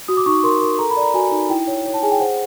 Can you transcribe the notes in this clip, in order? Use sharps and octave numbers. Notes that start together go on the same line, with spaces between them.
F#4 D#6
D6
D#4 C#6
A#4 C6
A#4
A4 A#5
B5
D5 A#5
F#4 G#5
D#4
E4 G5
C#5
C#5
A5
G#4 G#5
G5
C5 F#5